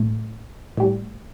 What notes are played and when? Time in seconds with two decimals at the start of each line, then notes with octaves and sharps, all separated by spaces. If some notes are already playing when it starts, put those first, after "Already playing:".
Already playing: A2 A3
0.77 A2 G3